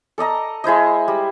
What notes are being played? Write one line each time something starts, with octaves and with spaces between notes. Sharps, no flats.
A4 D5 D#5 A#5
G#3 E4 C5 D#5
G3